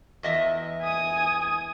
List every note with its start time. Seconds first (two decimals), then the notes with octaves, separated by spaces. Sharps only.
0.23 E2 D#5 E5
0.81 G#5 D#6